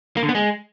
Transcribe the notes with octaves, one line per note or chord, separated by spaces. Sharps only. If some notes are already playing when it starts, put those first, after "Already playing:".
A#3
D3
B3
G#3